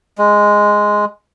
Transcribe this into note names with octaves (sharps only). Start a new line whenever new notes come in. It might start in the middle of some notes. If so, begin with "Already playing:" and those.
G#3